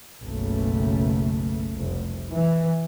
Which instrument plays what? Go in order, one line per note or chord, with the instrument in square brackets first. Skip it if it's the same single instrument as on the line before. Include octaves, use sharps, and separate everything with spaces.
[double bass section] F#1 B1 C#3 A3
F1 C2
E3